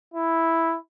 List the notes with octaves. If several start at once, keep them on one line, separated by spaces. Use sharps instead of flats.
E4